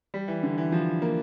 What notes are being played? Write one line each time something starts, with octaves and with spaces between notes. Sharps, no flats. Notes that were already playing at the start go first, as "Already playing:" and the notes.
G3
E3
D3
E3
F3
A#3